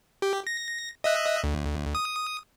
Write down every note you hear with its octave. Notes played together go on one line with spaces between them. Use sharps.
G4
A#6
D#5 E5 F#6
D2
D#6